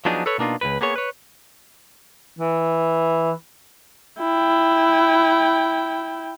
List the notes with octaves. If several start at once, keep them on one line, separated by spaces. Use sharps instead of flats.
F3 F#3 B3 D4 D#4 G#4
A4 B4 C#5
B2 A#3 D4 D#4 F4
C#2 G2 B4
A#3 B3 G#4 C#5
B4 C#5
E3
E4 G5